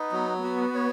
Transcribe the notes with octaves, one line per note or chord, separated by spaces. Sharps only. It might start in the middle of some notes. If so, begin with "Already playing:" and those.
Already playing: B3 D#4
F#3
B3 F#4
C#5